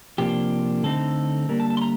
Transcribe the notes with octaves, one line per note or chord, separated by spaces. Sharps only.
C3 F3 A#3 D4 G4
D3 A3 C4 D#4 A4
D3 G3 A#3 A#4
A5
A5
C6
A#5